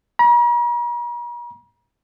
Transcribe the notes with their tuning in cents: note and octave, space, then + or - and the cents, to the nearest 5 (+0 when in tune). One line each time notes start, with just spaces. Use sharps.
A#5 +45